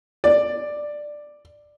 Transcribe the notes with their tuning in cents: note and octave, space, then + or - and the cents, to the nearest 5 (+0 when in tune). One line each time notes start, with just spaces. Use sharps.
D5 +10